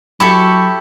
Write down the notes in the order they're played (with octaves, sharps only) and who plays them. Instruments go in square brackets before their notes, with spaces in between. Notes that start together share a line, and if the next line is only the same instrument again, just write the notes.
[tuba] F#3 [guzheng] E4 G4 A4 [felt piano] B5 [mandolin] C#6